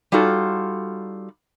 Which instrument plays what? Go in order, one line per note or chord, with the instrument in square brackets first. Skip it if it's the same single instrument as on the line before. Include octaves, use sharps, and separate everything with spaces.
[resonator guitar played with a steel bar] G3 D#4 F4 F#4 A4